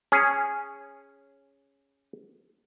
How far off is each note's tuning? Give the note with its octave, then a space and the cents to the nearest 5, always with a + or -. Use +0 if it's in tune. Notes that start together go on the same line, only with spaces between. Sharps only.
C#4 +0 G#4 -10